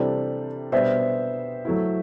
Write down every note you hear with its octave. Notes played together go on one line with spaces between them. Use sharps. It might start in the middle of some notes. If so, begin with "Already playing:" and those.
Already playing: C3 E3 G3 D4 A4 C5
B2 G3 B3 D4 C5 E5
F#3 A3 E4